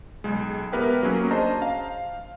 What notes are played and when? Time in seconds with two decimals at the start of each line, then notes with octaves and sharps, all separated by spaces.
0.24 B1 G#3
0.72 B3 G4 A#4 B4 E5 G5
1.03 F#3 A#3 C#4 G#4
1.31 D4 C5 D#5 A5 A#5
1.62 F5